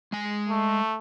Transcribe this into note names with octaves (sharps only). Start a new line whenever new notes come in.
G#3 G#5
A3